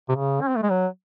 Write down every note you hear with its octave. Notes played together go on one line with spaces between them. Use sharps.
C3
C#3
C#4
C4
A3
G#3
F#3